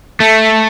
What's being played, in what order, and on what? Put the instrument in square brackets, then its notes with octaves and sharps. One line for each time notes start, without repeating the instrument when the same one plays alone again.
[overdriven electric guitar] A3